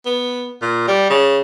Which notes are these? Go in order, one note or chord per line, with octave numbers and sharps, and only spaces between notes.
B3
A#2
G3
C#3